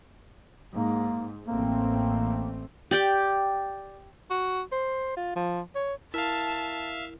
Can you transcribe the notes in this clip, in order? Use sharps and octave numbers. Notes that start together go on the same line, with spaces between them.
G#2 A#3
A1 A3 A#3 C4
G4 D5 G5
F#4
C5
F4
F3
C#5
E4 A#4 E5 F5 A5 F6